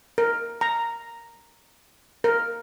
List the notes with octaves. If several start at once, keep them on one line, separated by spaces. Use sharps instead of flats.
A#4
A#5
A#4